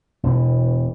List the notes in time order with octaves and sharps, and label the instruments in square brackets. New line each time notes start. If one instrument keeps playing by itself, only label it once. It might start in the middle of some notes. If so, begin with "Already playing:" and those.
[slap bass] E1 B2 E3